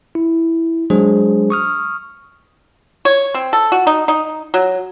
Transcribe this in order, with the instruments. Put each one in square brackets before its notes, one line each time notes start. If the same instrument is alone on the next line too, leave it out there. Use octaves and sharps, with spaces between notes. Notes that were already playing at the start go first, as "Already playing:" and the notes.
[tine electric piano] E4
F#3 G#3 D4 G#4 C5
C#6 D#6 F6
[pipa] C#5
C4
A4
F#4
D#4
D#4
F#3